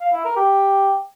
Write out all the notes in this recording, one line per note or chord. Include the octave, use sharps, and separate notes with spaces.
F5
E4
A#4
G4